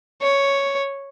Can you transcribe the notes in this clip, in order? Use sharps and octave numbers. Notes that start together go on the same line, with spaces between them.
C#5